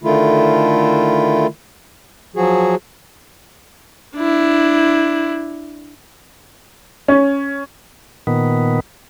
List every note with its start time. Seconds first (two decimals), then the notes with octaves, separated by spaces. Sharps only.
0.04 D3 D#3 A3 E4 F4
2.36 F3 F#3 F#4 G#4
4.16 D4 E4
7.08 C#4
8.27 A#2 D#3 B3